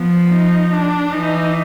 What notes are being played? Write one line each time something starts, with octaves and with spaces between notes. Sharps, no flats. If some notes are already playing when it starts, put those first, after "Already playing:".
Already playing: F3 B3
D#4
D4
E3 D#4